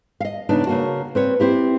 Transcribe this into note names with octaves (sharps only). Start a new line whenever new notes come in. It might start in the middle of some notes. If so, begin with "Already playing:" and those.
D#5 F5
C#3 B3 D4 D#4
C#3 A#3 F#4
C4 B4 C#5
C4 E4 G4